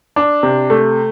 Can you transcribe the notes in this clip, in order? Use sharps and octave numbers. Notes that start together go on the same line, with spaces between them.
D4
C3
A3